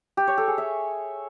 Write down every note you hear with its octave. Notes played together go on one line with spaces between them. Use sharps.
G4
C#5
A4
G#4
E5